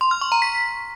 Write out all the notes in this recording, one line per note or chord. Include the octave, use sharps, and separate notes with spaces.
C6
F6
C#6
A#5
B6